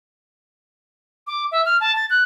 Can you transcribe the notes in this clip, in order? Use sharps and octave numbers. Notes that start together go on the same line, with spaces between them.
D6
E5
F6
A5
A6
F#6